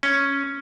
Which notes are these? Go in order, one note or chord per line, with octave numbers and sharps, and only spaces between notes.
C#4